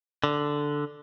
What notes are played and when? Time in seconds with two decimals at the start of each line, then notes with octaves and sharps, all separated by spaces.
0.24 D3